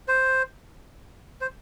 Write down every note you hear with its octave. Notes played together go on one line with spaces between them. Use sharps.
C5
C5